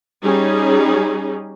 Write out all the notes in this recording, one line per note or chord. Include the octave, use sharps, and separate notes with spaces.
G3 C#4 D#4 G#4